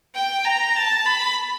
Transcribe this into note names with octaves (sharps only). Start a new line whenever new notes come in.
G5
A#5
A5
B5